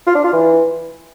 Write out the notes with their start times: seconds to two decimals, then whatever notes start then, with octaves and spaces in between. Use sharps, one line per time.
0.07 F4
0.15 D4
0.24 F4
0.33 E3